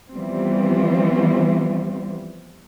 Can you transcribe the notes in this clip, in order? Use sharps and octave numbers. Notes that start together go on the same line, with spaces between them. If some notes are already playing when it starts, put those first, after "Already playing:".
E3 F3 G3 B3 C4